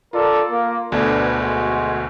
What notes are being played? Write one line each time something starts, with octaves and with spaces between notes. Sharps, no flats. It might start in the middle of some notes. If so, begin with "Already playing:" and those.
F4 A4 A#4 D5
A#3
D2 B2 D3 D4 B4
G#3 F#4